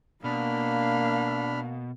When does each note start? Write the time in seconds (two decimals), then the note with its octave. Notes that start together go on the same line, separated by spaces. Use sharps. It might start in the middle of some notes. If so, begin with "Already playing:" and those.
0.24 B2 A#3 D4 F5 B5 F6